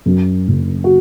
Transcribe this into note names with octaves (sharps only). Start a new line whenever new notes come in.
F#2
F#1
F#4